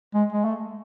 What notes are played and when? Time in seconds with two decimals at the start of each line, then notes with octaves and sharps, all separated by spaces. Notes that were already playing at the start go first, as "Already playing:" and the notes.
0.14 G#3
0.33 G#3
0.45 A3